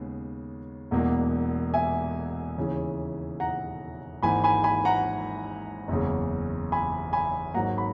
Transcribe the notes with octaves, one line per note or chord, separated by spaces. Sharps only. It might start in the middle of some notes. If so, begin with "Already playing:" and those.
Already playing: D#2 C#3 G#3 B3
E1 E2 B2 A#3
E5 G#5
D#2 C#3 E3
F#5 A#5
G#1 G#2 E3 A#3 G#5 B5
G#5 B5
G#5 B5
F#5 A#5
F#1 E2 C#3
G#5 B5
G#5 B5
G#1 G#2 F#3 A#3 F#5 A#5
B5